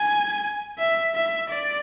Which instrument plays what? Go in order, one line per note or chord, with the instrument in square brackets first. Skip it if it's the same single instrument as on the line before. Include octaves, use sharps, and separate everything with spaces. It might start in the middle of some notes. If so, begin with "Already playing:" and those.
Already playing: [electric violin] G#5
E5
E5
D5